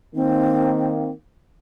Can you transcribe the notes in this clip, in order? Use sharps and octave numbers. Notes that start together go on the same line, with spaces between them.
D#3 A#3 C4